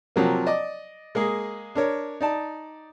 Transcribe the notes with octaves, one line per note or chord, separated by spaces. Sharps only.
C3 F3 F#3 A#3
D5 D#5 D6
G#3 A#3 G#4
D4 A#4 C#5
D#4 D5 A5